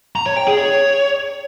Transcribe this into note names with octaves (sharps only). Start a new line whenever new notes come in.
A#5
C#5
G5
G#4
C#5